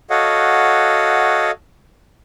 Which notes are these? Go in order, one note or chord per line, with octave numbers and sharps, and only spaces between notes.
F#4 A4 C#5 D#5 F5 F#5